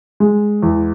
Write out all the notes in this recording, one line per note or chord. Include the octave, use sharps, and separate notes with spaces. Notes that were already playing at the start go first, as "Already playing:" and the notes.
G#3
E2